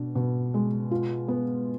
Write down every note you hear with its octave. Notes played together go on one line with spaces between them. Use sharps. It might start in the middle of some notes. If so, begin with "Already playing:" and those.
Already playing: B2 D4
B2
G#3
F4
B3